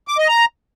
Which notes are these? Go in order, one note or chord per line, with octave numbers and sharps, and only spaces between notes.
D6
D#5
A#5